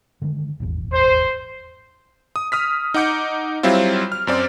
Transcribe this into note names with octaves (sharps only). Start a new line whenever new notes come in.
D3 D#3 G#3
D#1 G#1 E2
C5
D#6
D#6 F6 B6
D#4 F#5 D6 G6 C#7
F#3 G3 C4 E4 F4
F6
F#2 C4 D5